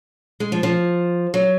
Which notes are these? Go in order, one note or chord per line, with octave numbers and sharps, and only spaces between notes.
G#3
F3
F3
F#3